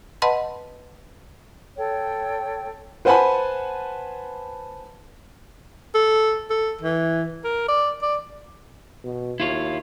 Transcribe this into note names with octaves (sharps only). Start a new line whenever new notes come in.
B4 D#5 F#5 A5 B5 C6
A4 C#5 G5
B4 C5 F#5 G#5 A5 B5
A4
A4
E3
A#4
D5
D5
B2
D#2 E4 F4 C#5